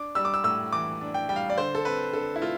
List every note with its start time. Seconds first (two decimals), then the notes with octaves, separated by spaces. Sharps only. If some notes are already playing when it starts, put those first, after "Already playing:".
Already playing: D4 D6
0.15 G3 E6
0.25 D6
0.34 E6
0.44 A2 E6
0.73 E3 D6
1.01 D4
1.14 G5
1.29 G3 G5
1.36 F5
1.50 D5
1.58 D3 C5
1.75 A4
1.85 C4 B4
2.13 D3 A4
2.36 E4
2.42 A3 F4